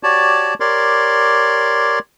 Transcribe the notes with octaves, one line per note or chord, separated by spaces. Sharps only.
F#4 G4 C#5 D5 A5
G4 A#4 C#5 D5 C6